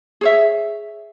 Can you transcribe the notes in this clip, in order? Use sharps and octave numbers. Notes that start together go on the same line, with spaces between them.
G#4 C#5 E5